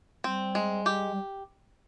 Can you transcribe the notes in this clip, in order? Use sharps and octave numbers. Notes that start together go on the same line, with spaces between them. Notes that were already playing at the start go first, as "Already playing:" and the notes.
G3 C4
G#3
G4
G3